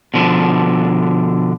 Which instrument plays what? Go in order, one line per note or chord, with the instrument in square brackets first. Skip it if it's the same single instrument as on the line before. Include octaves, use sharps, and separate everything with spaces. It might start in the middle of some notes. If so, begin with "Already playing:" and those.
[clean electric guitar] B2 D3 F3